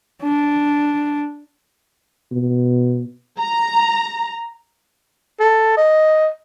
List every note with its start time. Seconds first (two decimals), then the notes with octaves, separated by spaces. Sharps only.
0.23 D4
2.32 B2
3.41 A#5
5.40 A4
5.77 D#5